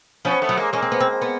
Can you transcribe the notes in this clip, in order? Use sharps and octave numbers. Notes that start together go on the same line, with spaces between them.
F3 B3 C#4
A3 B3
F#3
G#3 A#3
G#3 A#3 C#4
C4
B3
C4
B3